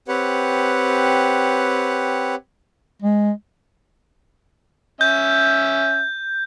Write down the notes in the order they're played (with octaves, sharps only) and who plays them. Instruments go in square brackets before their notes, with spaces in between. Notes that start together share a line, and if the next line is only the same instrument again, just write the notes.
[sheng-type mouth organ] C4 G4 B4 C#5 F#5
[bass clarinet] G#3
[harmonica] C#4 E5 [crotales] G6